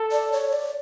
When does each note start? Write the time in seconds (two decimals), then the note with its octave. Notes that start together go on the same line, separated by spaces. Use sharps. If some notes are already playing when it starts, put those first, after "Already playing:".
Already playing: A4
0.11 D5
0.32 C#5
0.53 D5